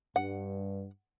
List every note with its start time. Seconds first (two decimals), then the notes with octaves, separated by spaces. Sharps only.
0.16 G2 F#5